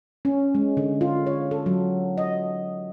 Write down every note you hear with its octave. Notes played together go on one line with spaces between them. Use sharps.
C#4
G#3
D3
F4
C#5
A4
F#3
D#5